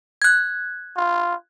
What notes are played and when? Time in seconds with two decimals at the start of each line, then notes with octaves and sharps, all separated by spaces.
0.22 F#6 G#6
0.96 F4